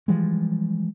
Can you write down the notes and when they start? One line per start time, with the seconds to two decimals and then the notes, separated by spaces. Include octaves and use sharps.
0.08 E3 F3 G3 G#3